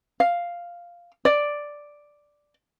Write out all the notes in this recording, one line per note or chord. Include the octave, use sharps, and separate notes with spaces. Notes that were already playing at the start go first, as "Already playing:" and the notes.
F5
D5